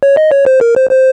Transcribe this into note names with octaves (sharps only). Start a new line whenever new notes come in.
C#5
D#5
C#5
C5
A#4
C5
C5